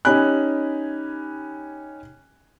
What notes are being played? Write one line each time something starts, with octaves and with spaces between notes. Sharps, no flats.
C#4 D#4 G4 G#5 B5 F#6